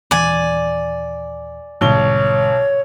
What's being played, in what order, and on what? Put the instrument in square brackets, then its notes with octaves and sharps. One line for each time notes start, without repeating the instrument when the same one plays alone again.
[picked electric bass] D#1 E3 [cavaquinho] D5 G#5
[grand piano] B1 G7 [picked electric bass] G#2 D3 G3 [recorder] C#5